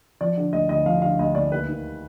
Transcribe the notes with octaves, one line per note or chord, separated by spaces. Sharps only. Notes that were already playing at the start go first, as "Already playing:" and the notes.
F3 D5
D3
D2 D#5
D2 D#5
F3 F5
D3 F5
D2 D#5
D2 D5
D#2 B4
D#3